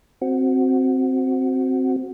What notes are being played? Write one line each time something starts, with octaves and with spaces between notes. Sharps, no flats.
C4 F#4